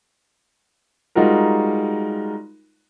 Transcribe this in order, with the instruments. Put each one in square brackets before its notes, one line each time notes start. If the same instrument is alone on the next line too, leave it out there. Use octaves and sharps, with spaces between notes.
[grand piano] G3 G#3 D#4 F4 F#4 A#4